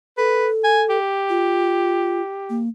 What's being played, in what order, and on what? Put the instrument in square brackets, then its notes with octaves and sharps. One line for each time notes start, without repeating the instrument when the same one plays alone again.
[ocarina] A4 [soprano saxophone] B4
[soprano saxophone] G#5
G4
[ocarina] F4
A#3